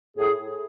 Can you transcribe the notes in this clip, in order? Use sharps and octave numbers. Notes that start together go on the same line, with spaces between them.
A2 G#4